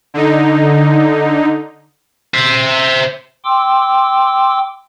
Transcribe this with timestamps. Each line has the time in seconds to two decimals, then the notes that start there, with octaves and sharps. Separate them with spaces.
0.14 D3 D#4
2.34 C5 E5
3.45 G5 C6 D6 E6